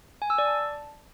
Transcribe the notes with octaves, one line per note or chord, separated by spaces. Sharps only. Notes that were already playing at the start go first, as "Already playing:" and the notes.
G#5
E6
D5
A5